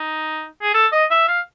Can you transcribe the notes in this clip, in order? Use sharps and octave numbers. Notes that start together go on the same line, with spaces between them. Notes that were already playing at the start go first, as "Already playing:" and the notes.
Already playing: D#4
G#4
A4
D#5
E5
F5